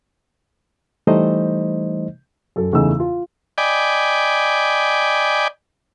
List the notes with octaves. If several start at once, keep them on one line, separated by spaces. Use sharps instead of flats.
E3 G3 A3 D#4 C5 D#5
F#2 A4
E2 C#3 A3 D#4 E6
F4
D5 D#5 G5 G#5 B5 D6